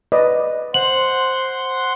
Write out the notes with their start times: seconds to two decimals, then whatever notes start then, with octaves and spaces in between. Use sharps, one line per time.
0.12 B4 D5 D#5
0.74 C5 F#5 C6 F#7